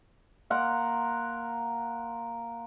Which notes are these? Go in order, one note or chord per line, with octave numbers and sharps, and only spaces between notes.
A#3 A#4 F#5 C6